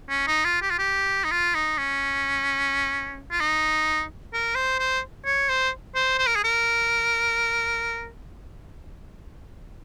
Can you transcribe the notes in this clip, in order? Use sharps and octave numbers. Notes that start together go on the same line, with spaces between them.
C#4
D#4
F4
G4
F4
G4
D#4
F4
D#4
C#4
F4
D#4
A#4
C5
C5
C#5
C5
C5
C5
A#4
G#4
A#4